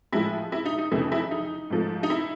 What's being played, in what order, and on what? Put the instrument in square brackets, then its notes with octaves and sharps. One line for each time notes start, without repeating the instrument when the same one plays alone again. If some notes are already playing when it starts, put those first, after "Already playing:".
[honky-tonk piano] A2 F3 G#3 E4
E4
D#4
D#4
F2 C#3 E3 A3 E4
E4
D#4
G#2 F3 A3
D#4
E4